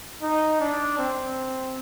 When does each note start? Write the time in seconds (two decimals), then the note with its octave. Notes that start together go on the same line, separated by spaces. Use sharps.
0.23 D#4
0.60 D4
0.99 C4